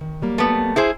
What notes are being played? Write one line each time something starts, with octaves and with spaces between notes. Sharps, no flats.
D#3
F#3 G3 A#3
A3 B3
E4 G#4 C5